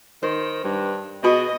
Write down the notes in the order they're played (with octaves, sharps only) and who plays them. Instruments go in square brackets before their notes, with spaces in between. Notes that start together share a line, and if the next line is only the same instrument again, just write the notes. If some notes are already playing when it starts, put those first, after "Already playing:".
[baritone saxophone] D#3 [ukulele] C5
[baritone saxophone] G2
[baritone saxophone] B2 [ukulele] F#4 G#4 B5 [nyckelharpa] D#5